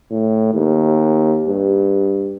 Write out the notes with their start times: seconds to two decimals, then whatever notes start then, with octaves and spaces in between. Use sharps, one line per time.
0.11 A2
0.54 D#2
1.48 G2